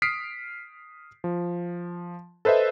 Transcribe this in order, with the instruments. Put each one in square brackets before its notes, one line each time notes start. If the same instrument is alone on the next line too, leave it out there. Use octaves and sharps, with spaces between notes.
[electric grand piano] D#6 F6 B6 C7 D7
F3
A4 B4 C5 D#5 E5